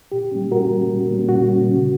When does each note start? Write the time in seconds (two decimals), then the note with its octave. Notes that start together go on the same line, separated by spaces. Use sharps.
0.12 A#2 G4
0.32 G3 A#3 C#4
0.51 A#2 F#4 A#4
0.71 G3 A#3 C#4
0.90 A#2
1.10 G3 A#3 C#4
1.29 A#2 F#4
1.49 G3 A#3 C#4
1.68 C#3